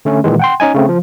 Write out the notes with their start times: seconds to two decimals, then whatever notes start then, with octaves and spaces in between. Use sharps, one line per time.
0.05 D3 A3 C#4
0.24 A#2 D#3 E3 G#3
0.40 F#5 G5 C6
0.60 C#4 D#4 D#5 G#5
0.74 C#3 A3 C4
0.89 F3